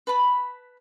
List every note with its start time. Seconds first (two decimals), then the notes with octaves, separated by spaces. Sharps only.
0.07 B4 A5 B5